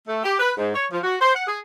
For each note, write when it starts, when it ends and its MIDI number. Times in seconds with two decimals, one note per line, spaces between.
0.07 0.20 57
0.23 0.36 67
0.38 0.52 71
0.57 0.71 44
0.74 0.85 73
0.91 0.98 53
1.03 1.16 66
1.21 1.35 72
1.35 1.45 78
1.47 1.58 68